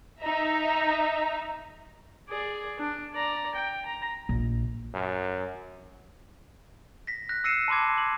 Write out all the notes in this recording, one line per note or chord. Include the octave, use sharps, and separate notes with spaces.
D#4 E5 A#5
G#4 D5
D4
D5 A#5
G5
A#5
A#1
F#2
A#6 B6
F#6 A#6
E6 A#6 C7 C#7 D#7 E7
A5 B5 C6 D6 G#6
F#7